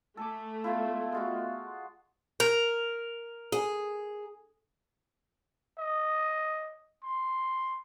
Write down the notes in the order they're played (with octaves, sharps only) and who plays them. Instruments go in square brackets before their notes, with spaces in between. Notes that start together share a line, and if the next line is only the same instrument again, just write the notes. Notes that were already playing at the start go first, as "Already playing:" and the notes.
[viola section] A3 [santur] A4 G#5 D6
[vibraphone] B3 E5 F5 [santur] E4 F4 C5
[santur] G#3 F4 F#4
[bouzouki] A#4
[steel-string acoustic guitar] G#4
[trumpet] D#5
C6